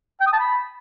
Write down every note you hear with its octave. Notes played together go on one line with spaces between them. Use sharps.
G5
D#6
A5
B5